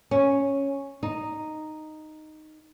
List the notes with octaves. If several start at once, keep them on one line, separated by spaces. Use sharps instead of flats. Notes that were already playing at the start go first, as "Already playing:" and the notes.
C#4
D#4